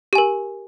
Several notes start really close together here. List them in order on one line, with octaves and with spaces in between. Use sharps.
G4 G#5 A#4